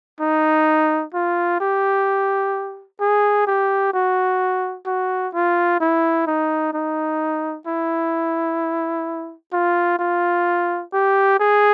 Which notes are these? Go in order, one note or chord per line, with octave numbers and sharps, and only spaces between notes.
D#4
F4
G4
G#4
G4
F#4
F#4
F4
E4
D#4
D#4
E4
F4
F4
G4
G#4